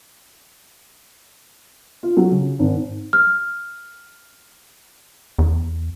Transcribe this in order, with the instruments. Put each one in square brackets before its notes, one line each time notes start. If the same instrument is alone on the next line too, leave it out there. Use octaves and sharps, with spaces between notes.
[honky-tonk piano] F4
F#3
C#3
G#1
[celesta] F6
[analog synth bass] E2